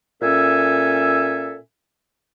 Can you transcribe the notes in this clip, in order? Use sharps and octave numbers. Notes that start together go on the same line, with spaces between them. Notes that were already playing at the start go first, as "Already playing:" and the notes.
A#2 C#4 A4 E5 G#5